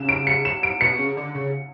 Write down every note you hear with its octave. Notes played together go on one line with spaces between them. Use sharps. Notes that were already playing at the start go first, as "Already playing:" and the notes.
Already playing: C#3 E7
D7
C#7
E7
D7
B2 C#7
C#3
D3
C#3